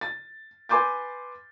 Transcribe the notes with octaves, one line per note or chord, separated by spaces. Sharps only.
A6
B4 G#5 C6 D6 G6 A6